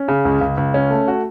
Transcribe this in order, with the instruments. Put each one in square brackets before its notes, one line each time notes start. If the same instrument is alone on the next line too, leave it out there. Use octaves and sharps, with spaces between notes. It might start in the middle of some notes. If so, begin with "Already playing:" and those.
Already playing: [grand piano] C#4
C#3
C#2
C#2
C#2
C#4
A3
F#4